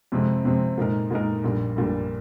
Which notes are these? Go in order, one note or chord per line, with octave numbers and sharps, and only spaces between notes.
F2 C3 F3 G#3 C4
F2 C3 F3 G#3 C4
A#2 G#3 D#4 A#4
A#2 G#3 D#4 A#4
A#1 A#2 G3
A#1 A#2 G3